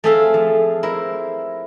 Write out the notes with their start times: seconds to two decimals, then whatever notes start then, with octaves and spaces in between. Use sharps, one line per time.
0.04 A3 C4 G#4 A4 E5 F5
0.34 F3
0.83 E4 A#4 C5